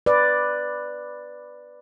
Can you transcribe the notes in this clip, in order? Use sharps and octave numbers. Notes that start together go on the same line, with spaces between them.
B4 D5